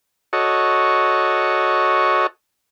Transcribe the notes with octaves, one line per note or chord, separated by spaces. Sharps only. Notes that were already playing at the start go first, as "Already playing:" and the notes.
F#4 A4 C#5 D#5